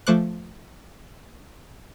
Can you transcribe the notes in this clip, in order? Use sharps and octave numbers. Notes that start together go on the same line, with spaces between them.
F3 A3 C5 C#6 D6 F#6